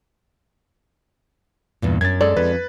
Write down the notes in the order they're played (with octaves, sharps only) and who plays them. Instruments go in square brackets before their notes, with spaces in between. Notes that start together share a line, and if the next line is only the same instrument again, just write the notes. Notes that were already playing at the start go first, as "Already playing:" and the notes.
[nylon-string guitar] E2 G2 A#2
[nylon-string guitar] F#2 [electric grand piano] G#6 A6
[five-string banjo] G#3 A4 D5
[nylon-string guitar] F2 [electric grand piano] B4